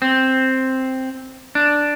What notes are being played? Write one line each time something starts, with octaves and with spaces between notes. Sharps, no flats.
C4
D4